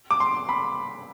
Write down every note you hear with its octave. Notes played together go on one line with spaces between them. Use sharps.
D6
C6
B5